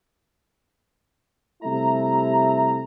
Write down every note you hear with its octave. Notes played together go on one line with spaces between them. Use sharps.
C3 G3 A3 E4 E5 A#5